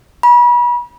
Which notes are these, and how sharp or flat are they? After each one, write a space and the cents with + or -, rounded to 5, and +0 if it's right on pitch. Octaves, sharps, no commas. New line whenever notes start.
B5 -35